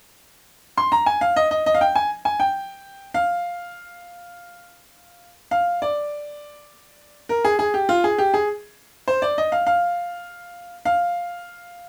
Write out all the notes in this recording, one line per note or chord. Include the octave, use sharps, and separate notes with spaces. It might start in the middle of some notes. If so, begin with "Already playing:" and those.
C6
A#5
G#5
F5
D#5
D#5
D#5
F5
G5
G#5
G#5
G5
F5
F5
D5
A#4
G#4
G#4
G4
F4
G#4
G4
G#4
C5
D5
D#5
F5
F5
F5